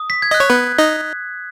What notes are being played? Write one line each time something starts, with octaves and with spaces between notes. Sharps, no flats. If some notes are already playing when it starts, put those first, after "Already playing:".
Already playing: D#6
B6
G#6
D#5 F#6
C#5
B3 B4
D#4 D#5